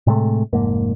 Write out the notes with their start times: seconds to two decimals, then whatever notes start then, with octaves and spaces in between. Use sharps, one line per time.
0.07 A2 C3 G#3 A3
0.53 F1 G#2 A#3